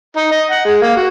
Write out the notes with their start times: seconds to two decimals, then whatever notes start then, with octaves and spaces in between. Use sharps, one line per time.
0.17 D#4
0.31 D#5
0.50 F#5
0.65 G#3
0.82 A#3
0.96 F#4